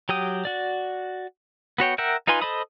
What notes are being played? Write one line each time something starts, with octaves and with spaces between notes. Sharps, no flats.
F#3 G4 G5 D#6
F#4 D5
B3 F#4 C#5 G5
A#4 E5 F#5 G5
D#4 F4 B4 G#5 C6
A4 C5 D#5 B5 D#6